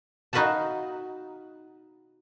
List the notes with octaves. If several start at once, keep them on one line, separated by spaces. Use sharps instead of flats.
D#4 F#4 B4 F5 F#5 A5